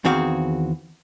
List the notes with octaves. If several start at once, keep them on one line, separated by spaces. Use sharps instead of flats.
E2 D#3 C4 F#4 G#4 F5